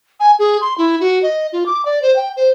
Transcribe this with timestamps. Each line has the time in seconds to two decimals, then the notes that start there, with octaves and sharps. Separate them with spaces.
0.20 G#5
0.39 G#4
0.61 C6
0.78 E4
1.00 F#4
1.23 D#5
1.53 F4
1.66 D6
1.85 D5
2.02 C5
2.16 G5
2.36 C5